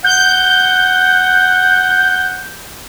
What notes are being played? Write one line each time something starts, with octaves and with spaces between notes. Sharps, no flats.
F#5 G6